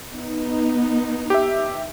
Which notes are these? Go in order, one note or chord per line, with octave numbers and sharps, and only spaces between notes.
B3 D#4
G4 E5